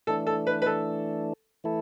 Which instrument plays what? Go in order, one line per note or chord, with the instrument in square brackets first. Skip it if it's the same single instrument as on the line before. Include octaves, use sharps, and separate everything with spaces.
[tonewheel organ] E3 A3 D4 [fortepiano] A4
[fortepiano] A4
B4
B4
A4
[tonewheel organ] E3 A3 E4 A4